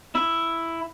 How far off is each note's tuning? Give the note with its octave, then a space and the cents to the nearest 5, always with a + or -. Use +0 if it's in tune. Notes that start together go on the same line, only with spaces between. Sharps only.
E4 +5